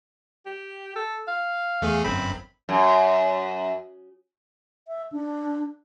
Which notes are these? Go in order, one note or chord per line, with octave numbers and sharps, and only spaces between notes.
G4
A4
F5
E2 A3 G#4
G1 F#2 C4 B5
F#2
E5
D4